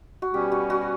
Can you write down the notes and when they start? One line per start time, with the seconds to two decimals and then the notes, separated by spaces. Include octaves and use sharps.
0.22 F#4
0.34 B2 G3 C#4 G4
0.52 F#4
0.70 F#4